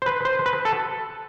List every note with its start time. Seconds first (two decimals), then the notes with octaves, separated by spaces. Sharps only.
0.02 C5
0.06 B4
0.25 C5
0.46 B4
0.65 A4